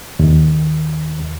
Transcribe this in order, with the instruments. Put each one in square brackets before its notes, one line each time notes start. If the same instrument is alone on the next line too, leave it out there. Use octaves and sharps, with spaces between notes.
[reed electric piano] D#2